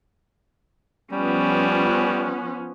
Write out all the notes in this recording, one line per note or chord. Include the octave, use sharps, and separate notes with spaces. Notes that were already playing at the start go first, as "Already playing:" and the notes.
F3 G3 B3 C#4